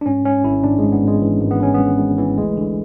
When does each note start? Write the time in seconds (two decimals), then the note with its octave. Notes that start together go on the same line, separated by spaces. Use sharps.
0.01 D4
0.06 G#2 C#4
0.25 G#2 C#4
0.44 G#1 E4
0.64 G#1 D4
0.79 G#2 G#3
0.92 B3
1.02 G#1
1.07 G#3
1.22 E3
1.41 G#1
1.51 B3
1.60 E3 C#4
1.74 G#1 B3
1.99 G#1
2.18 E3
2.37 D2 G#3
2.57 D3